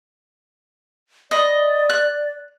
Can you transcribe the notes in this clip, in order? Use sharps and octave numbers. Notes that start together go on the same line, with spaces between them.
D5 D#5 B5
F#6